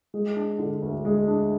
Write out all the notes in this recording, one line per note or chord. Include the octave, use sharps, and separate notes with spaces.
G#3
D4
D3
D2
G#3
D4